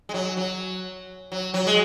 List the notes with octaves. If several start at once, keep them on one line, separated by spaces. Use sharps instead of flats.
G#3
F#3
F#3
F#3
F#3
G#3